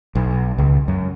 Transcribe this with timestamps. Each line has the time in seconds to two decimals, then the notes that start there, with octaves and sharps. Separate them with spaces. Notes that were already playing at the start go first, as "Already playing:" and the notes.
0.15 B1
0.58 C#2
0.88 F#2